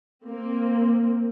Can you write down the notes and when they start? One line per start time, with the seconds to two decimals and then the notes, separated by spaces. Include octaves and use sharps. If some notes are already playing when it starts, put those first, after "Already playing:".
0.24 A#3 C4